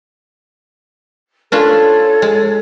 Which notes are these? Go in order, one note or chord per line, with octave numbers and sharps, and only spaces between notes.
C#4 D4 F4 A4 C#5
G#3